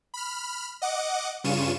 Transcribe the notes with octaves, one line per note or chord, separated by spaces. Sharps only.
B5 F6
D#5 F#5 D6
G2 C#3 F4 C#6 D#7 E7